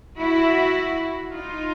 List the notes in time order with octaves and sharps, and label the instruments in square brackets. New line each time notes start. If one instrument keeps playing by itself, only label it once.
[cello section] E4 F#4
D#4 F4